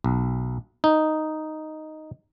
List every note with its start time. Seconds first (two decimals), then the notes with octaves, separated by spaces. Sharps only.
0.04 B1
0.84 D#4